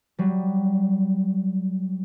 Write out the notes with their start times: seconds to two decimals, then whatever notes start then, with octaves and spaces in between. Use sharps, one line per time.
0.18 F#3 G3